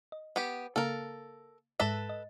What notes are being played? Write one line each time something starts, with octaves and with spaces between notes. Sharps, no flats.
D#5
B3 G4
C#3 A#3 A4 A#4 F5
G#2 G#3 A4 B4 E5 A#6
D#5